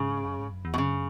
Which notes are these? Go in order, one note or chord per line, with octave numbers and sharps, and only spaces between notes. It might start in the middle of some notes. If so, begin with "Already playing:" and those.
Already playing: G#2 C#3
F#2
G#2
F#2
E2
B2
F#2 C#3